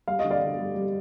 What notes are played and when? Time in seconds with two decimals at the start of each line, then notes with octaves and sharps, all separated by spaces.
0.07 G3 F5
0.19 D#5
0.24 D3
0.31 D5 F5
0.41 D3
0.58 G3
0.75 G3